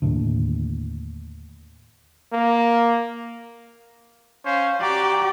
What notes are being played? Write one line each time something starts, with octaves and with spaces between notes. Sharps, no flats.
D#2 A2 D3
A#3
C#4 C5 F5
F#4 G4 D5 A#5